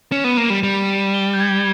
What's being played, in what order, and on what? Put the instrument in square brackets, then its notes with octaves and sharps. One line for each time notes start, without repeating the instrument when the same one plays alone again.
[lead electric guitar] C#4 [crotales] E7
[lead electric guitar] B3 [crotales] D#7
[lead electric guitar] A#3 [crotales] E7
[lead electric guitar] G3
G3
[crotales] G7
G6
G#6